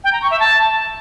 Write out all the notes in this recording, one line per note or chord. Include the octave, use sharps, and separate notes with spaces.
G5
A#5
C#6
E5
A5